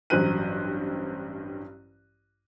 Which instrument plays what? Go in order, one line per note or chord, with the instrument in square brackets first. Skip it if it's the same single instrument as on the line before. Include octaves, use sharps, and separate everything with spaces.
[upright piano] A1 G2 F#3 C5 F#6 D#7